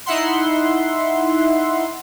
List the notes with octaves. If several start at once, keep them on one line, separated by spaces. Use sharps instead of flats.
D#4 E4 E5 F#5 C6